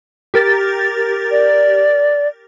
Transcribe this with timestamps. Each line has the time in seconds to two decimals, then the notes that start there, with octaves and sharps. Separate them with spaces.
0.34 G4 A#4 A6
1.31 D5